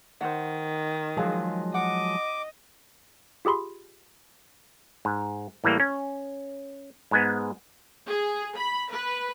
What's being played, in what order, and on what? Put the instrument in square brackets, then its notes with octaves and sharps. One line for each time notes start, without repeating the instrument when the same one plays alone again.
[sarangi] D#3 [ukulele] C5 F#5
[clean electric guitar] F3 F#3 G#3 [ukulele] G#4 F5
[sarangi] D#5 [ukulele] F#5 [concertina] D6
[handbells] F4 G4 G#4 B5 C6
[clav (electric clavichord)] G#2
A2 E3 G3 A#3
C#4
G#2 G#3 B3
[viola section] G#4
B5
B4